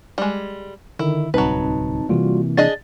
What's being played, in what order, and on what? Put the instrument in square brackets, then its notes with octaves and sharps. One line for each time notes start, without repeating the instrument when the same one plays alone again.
[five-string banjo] G3 G#3
[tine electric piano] D3 D#3 [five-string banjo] E4
[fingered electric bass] D1 C2 [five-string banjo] F#3 B4 [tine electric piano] C4 D#4 A5
[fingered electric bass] C3 E3 A#3 [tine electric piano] G3 F4 F#4
[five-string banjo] D4 G#4 D#5 [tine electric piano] A6